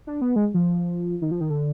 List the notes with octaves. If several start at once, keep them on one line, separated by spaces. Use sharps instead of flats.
D4
B3
G#3
F3
D#3
F3
D#3
D3